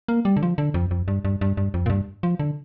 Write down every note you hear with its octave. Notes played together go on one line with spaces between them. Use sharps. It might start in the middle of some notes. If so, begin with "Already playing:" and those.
A#3
G3
D3
F3
D3
F2
F2
G2
G2
G2
G2
F2
A#2
G2
F3
D3